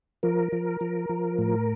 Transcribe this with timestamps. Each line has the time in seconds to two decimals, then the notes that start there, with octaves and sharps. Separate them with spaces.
0.23 F3 A#4
0.52 F3
0.81 F3
1.09 F3
1.38 A2